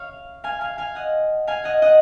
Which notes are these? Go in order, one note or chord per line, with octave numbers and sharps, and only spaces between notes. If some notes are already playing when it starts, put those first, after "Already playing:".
Already playing: C#5 F5
F5 G#5
F5 G#5
F5 G#5
D#5 F#5
F5 G#5
D#5 F#5
D#5 F#5